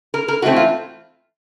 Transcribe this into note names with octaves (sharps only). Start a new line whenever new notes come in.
A#4
A#4
G#2 E3 A3 C4 F#4
F4